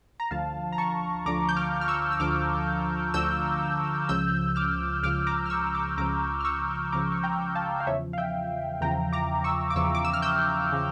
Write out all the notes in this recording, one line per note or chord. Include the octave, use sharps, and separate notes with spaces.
A#5
D2 D3 F3 F5 A5
A#5
A5 C#6
D2 D3 F3 A#5 D6
G6
D6 F6
F6
C#6 E6
E6
D2 D3 F3 D6 F6
D2 D3 F3 E6 G6
C#2 C#3 F3 E6 G6
D6 F6
C#2 C#3 F3 D6 F6
A#5 D6
F6
C#6 E6
A#5 D6
C#2 C#3 F3 A#5 D6
F6
C#6 E6
C#2 C#3 F3 A#5 D6
C#6
G5 A#5
F5 A5
F5
E2 C#3 F3 C#5 E5
F5
E5 G5
E2 C#3 F3 G5 A#5
A#5 D6
C#6 E6
D6
E2 C#3 F3 C#6 E6
D6
E6
F6
E6 G6
C#3 F3